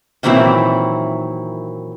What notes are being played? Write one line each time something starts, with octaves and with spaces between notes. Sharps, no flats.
A#2 D#3 E3 F#3 C4 E4